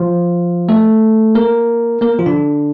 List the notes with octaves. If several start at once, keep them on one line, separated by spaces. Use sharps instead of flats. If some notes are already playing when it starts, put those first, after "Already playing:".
Already playing: F3 F4
A3 A4
A#3 A#4
A#3 A#4
F3 F4
D3 D4